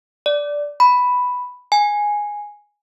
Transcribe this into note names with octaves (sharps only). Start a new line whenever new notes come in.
D5
B5
G#5